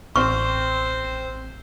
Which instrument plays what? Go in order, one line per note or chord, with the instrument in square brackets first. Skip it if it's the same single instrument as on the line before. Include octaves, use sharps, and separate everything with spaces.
[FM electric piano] A1 [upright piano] C4 F6 [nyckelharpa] C5 [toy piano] C#6